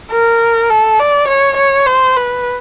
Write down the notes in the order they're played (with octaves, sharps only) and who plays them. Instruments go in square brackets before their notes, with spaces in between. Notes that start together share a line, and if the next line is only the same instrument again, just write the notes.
[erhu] A#4
A4
D5
C#5
C#5
C5
B4